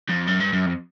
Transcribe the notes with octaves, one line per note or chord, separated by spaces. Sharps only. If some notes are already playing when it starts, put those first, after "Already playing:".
F2
F#2
G2
F#2
F2